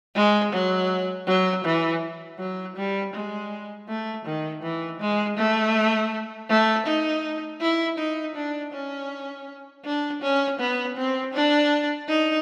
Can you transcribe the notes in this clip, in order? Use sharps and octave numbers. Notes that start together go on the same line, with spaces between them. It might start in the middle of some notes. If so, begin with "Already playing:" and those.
G#3
F#3
F#3
E3
F#3
G3
G#3
A3
D#3
E3
G#3
A3
A3
D#4
E4
D#4
D4
C#4
D4
C#4
B3
C4
D4
D#4